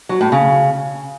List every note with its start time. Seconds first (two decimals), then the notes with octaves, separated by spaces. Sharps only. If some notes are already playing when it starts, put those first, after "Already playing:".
0.09 F#3
0.21 A2
0.32 C#3